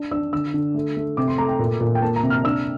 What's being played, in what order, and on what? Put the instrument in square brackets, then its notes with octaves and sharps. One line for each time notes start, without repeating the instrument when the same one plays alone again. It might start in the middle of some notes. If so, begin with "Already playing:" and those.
Already playing: [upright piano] D4
D4 E6
D3 E6
D3
A3
A3
C3 D6
C6
A3 A#5
G5
A#2
A#2
G5
A#3 A5
A#5
C3
F6
D4 E6